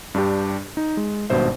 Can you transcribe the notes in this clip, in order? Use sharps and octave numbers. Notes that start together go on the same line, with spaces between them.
G2 D4 G4
D#4
G#3
G#1 G2 B2 C5 E5